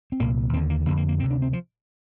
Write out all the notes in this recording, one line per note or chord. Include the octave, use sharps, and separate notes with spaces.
C4
C2 A#2 A#3
D#2 D3 C4
A#3
F2 D3 A#3
A#3
A#3
D2 C3 C4
D4
C4
F3